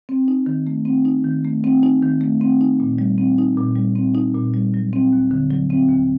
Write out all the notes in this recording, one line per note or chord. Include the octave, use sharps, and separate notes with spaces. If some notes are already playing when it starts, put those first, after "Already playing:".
C4
D#4
D#3
A3
C4
D#4
D#3
A3
C4
D#4
D#3
A3
C4
D#4
A#2
G3
C4
D#4
A#2
G3
C4
D#4
A#2
G3
F#3
C4
D#2
D3
F#3
C4
D#2